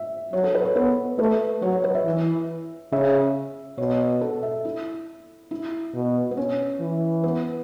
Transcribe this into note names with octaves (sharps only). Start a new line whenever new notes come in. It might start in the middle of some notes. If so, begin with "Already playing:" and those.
Already playing: E5
F#3 C#5
A4
B4
C#5
B3 B4
A3 B4
F#3 C#5
C#5
B4
E5
E3
C#3 E5
B2 C#5
A4
E5
E4
E4
B2
B3
C#4
E3
B3